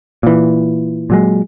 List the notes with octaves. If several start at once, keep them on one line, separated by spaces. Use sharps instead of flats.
A#2 E3
A#2 F#3 G#3